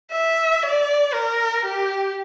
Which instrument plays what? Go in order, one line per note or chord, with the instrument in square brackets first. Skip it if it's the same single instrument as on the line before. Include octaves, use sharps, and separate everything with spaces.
[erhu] E5
D5
A#4
G4